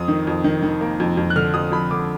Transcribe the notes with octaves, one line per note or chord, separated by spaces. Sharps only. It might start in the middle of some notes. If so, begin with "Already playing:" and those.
Already playing: F2 D#6
D#3
F2
D#3
D#3
A#3
F2
F2
F#6
D3 F6
F2 D#6
F2 B5
D3 D6